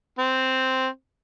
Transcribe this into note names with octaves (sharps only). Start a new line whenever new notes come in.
C4